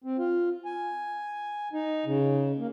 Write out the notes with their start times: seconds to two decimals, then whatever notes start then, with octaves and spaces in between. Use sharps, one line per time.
0.04 C4
0.18 F4
0.65 G#5
1.73 D#4
2.06 C#3
2.59 A#3